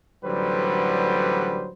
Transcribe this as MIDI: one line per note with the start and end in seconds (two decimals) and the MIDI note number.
0.24 1.69 33
0.24 1.69 50
0.24 1.69 54
0.24 1.69 55
0.24 1.69 71
0.24 1.69 72